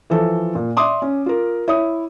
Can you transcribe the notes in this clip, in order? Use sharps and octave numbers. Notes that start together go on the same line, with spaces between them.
E3 F3 A4
A#2
D5 E5 C6 D6 D#6
C#4
F4 A#4
E4 C#5 D#6